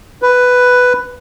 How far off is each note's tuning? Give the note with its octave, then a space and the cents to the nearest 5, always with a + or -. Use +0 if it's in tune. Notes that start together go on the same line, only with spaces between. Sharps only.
B4 +5